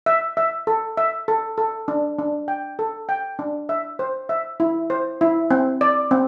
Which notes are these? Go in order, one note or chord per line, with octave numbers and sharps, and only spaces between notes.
E5
E5
A4
E5
A4
A4
D4
D4
G5
A4
G5
D4
E5
C5
E5
E4
C5
E4
C4
D5
C4